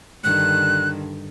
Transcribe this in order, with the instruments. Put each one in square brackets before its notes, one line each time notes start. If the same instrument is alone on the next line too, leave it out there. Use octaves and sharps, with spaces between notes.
[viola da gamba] G2 D3 D#3 [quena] F#6